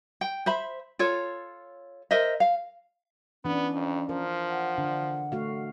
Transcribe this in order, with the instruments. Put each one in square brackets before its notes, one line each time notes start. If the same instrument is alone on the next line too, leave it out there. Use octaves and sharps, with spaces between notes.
[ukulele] G5
C5 E5 B5
F4 A4 C#5
A#4 C5 D#5 E5
F5
[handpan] E3 D4 [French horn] B3 [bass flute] C#4
[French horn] F2
[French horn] F3 [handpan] A#4
[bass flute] F#5
[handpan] D3 D4
A3 F#4 F5